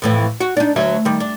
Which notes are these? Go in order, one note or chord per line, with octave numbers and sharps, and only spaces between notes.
F2 A2 E3
F#4
D4 D#4
D2 F#3 E5
D#3 G3
D4